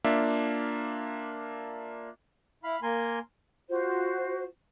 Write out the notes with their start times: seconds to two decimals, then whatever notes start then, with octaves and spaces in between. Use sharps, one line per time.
0.04 A#3 D4 F4 E5
2.64 E4 F5 B5
2.83 A#3 A#4 G#5 C6
3.68 F4 F#4 C5